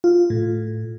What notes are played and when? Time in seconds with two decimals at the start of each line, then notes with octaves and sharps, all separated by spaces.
0.04 F4
0.30 A2